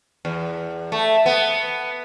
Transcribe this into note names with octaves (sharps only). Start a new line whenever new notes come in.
E2
A3
B3